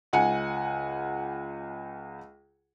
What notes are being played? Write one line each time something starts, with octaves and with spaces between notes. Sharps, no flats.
C#2 F#5 G#5 C#7